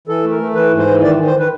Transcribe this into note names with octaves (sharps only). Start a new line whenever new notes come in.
E3 A4
A3
A#4
A3
E3 B4
G#2
C5
E3
D#3 D5
D#3
C5
D#3 B4